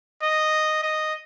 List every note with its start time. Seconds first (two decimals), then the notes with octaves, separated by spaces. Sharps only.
0.23 D#5
0.83 D#5